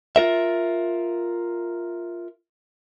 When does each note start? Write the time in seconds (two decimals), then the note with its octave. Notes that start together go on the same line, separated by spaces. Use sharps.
0.16 F4 A#4 E5